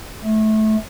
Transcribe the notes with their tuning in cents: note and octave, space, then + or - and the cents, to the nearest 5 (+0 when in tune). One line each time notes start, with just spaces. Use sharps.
A3 -20